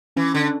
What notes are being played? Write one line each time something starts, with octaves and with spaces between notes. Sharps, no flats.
E3 C#4
D3